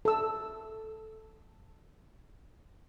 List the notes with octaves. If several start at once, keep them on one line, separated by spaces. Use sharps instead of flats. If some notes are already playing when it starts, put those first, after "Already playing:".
A4 E6